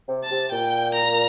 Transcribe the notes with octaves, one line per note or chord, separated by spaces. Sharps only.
C3
A5
C3
A#2 G5
A#5